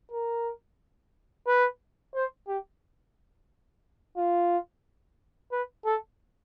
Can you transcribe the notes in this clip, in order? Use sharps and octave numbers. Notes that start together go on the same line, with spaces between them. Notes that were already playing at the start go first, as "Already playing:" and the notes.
A#4
B4
C5
G4
F4
B4
A4